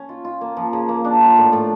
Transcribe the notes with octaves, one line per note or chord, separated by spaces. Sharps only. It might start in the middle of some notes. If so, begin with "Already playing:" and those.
Already playing: C#4
F4
F4
A#3
F3
C#3
A#3
D4
F4
A2
A2